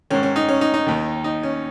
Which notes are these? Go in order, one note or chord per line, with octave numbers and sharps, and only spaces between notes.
G#2 D#3 C#4
C#4
D#4
C#4
D#4
D#4
D#2 D#3
D#4
C#4